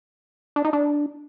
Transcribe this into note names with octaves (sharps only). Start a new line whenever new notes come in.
D4
D#4
D4